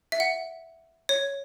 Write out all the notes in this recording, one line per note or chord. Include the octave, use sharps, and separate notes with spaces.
E5
F#5
C#5